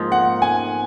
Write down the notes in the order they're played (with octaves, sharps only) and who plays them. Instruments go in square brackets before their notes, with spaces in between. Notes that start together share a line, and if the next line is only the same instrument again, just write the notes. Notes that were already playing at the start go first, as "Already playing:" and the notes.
Already playing: [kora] G#2 F3 A#3 D#4
[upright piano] F#5
G#5